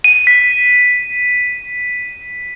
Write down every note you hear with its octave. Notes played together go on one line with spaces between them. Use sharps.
D#7
B6